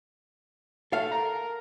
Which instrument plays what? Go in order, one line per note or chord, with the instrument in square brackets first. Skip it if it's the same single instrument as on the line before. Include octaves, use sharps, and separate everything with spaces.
[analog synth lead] A3 [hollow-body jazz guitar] A4 F5
[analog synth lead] A#4